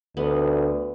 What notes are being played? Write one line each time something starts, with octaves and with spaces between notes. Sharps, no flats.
D2 B3